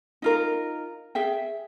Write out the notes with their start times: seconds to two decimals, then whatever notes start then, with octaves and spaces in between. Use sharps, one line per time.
0.22 D#4 F4 A#4
1.15 G#4 E5 G5